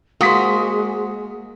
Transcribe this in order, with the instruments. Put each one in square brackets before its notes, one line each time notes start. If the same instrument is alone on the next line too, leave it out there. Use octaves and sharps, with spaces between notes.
[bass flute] G#3 [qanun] A#3 [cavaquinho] F#4 C5 [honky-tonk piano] D#6 B6